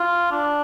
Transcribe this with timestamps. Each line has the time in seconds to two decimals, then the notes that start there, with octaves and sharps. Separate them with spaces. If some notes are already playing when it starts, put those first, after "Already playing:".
Already playing: F4
0.31 D4